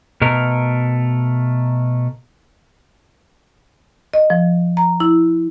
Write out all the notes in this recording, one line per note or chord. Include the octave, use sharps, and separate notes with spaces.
B2 A3 A#4
D#5
F3
A#5
E4